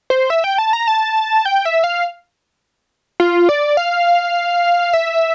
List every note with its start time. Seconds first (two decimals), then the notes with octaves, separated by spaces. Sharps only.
0.10 C5
0.30 E5
0.44 G5
0.58 A5
0.73 A#5
0.88 A5
1.45 G5
1.65 E5
1.84 F5
3.20 F4
3.49 D5
3.77 F5
4.93 E5